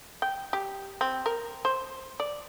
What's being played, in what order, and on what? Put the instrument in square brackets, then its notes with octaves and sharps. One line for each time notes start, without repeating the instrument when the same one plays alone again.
[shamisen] G5
G4
C4
A#4
C5
D5